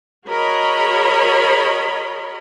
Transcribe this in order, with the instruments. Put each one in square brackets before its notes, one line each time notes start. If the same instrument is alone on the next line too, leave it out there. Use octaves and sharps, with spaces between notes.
[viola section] F#4 G#4 A#4 C#5 D#5 B5